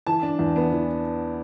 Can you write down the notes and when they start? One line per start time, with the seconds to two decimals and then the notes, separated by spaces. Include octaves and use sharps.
0.07 E3 A5
0.23 D4
0.39 E2
0.56 B3
0.72 E3